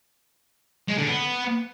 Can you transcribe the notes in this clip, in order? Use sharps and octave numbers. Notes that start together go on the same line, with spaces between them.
G#3
D3
B3